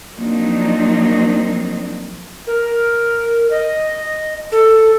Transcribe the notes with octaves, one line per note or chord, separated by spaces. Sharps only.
F3 F#3 A#3 C4 D4 D#4
A#4
D#5
A4